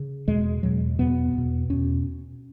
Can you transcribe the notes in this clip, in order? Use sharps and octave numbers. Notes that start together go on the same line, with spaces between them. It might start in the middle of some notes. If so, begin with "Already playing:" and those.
Already playing: C#3
E2 B2 G#3
E2 B2 F#3
E2 B2 B3
E2 B2
E2 B2 C#4